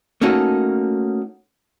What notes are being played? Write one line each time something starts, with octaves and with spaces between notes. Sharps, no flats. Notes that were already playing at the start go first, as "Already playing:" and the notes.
A3 A#3 C#4 D#4 F#4 A4